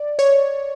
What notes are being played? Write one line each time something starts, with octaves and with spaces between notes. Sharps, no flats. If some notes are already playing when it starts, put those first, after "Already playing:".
Already playing: D5
C#5